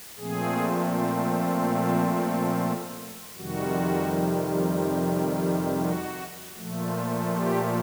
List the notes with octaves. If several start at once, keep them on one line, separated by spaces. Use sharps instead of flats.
A#2 F3 A3 C4 G#4
A4
A4
F2 C3 D#3 G3 F#4
F#4
A#2 F3 A3
G4